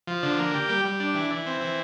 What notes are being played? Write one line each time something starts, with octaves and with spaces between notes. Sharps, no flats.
F3
D3
A#3
G4
G3
G3
D4
E3
E3
C4
E3